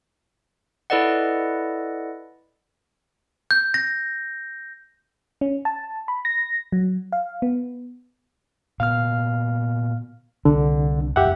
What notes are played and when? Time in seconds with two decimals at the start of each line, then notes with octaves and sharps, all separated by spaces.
0.90 E4 A4 B4 D5 D#5 F#5
3.51 G6
3.74 A#6
5.41 C#4
5.65 A5
6.08 B5
6.25 A#6
6.72 F#3
7.12 F5
7.42 B3
8.80 A#2 B3 F5 F6
10.45 C2 D3
11.16 E1 F#2 G4 E5 F#5